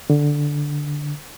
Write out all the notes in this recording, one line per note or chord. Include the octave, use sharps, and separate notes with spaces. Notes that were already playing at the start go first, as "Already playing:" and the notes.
D3